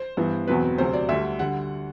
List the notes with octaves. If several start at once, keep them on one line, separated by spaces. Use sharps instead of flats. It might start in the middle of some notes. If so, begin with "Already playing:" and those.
Already playing: C5
G2 E3 B3
E2 B2 F#3 C4 B4
D2 C3 F#3 C5
D5
D2 D3 G3 E5
D3 G3 F#5